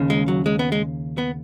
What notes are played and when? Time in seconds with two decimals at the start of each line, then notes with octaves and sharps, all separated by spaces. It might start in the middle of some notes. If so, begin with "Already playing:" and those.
Already playing: D#2 C#3
0.10 G#3
0.28 F#3
0.46 G#3
0.59 B3
0.72 G#3
1.18 B3